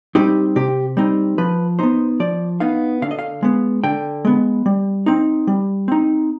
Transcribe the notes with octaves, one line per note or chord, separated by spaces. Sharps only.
G3 C4 D#4 G4
C3 G4
G3 C4 D#4
F3 B4
B3 D#4 C5
F3 D5
B3 D#4 F5
D3 F5
D#5
F5
G#3 B3
D3 G5
G#3 B3
G3
C4 D#4
G3
C4 D#4